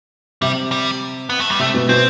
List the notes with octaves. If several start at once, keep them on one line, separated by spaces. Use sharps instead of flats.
C3 G3
G3
B3
A3
G3
C3 A3
B2
B2 C4